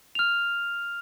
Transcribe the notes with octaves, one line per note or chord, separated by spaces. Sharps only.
F6 F7